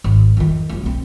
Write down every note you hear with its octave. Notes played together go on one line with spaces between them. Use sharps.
G#1
F2 D#3
F#1 C#2
B1 C4